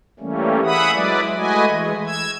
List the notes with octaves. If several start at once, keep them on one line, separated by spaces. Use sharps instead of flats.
E3 G3 A3 A#3 C#4
G#4 E5 F#5 B5 D#6
F#3 G#3 E4 B4 D5
G#3 A3 F#4 B4 D#5 G#5
E3 G#3
E6 G#6